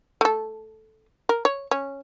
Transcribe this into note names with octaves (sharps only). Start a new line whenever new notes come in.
A3 A4
A#4
C#5
C#4